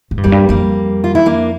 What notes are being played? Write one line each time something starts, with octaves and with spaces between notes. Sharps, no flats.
A2
G2
F2 G3 A#3
G2
F2 G3 A#3
F4
E4
A#3 D4